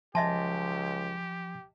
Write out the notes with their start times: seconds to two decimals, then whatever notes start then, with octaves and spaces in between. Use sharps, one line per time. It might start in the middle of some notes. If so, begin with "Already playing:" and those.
0.15 C#2 F3 G4 D#5 E5 G#5 A5 C6